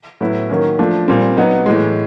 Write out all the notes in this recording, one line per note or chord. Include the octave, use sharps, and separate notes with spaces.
A2 F#3 B3 E4
D#3 F#3 A#3 C#4
F3 A3 D4
A#2 G3 C4
F#3 B3 D#4
A2 E3 G#3